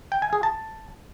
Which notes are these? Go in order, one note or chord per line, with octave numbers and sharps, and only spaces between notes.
G5
G#5
G#4
A5